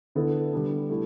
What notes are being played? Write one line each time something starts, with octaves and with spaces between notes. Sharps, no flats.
D3 B3 E4 A4
D3 G3 B3
A3 E4